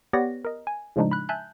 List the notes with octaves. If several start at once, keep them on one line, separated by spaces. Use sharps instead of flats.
B3 G4 C#5 D5 F#5 A#6
A#4 D#5
G#5
A2 C#3 F3 G#3 D4 D#4
B5 F#6
E5 G#5 A5 F#6 G6